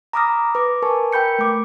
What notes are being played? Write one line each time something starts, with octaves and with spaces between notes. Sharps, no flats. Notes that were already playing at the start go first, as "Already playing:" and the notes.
A#5 B5 D6 D#6 F6 A#6
B4 D6
A#4 B4 G#5 A5 C#6
A#4 G5 B5 G6 C#7
A3 D6